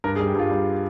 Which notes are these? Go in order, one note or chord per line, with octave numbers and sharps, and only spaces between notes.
G2 A#4
G#4
G3
G4
G2 F4
G3